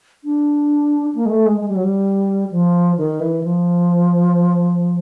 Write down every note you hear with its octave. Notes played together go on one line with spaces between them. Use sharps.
D4
A#3
G#3
A3
G#3
G#3
G3
F#3
G3
F3
D#3
E3
F3